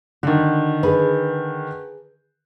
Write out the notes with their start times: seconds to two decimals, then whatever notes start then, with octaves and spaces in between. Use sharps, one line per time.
0.23 D3 D#3 F#4
0.83 G#4 B4